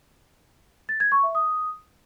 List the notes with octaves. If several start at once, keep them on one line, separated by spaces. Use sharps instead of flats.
A6
G#6
C#6
E5
D#6